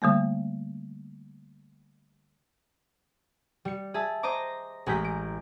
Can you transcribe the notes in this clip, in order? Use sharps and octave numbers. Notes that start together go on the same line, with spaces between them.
D3 G3 A3 A#3
G3 C#7
G#4 E5 A5
C5 D#5 A#5 D6
A1 G#3 A#5 G6 B6
D7